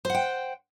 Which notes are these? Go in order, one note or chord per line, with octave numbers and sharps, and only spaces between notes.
C5 F#5 G5